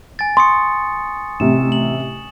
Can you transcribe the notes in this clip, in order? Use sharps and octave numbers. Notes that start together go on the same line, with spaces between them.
G#5 A6
C6 C#6 D#6 C#7
A1 C3 E7
F#7